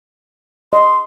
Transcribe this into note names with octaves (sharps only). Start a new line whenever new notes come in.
D#5 C6